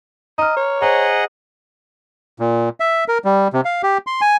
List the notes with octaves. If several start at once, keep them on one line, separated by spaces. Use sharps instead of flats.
D#5 A#5 F6
C#5
G#4 C5 D#5 F#5 A#5
A#2
E5
A#4
G3
C3
F5
G4
C6
G#5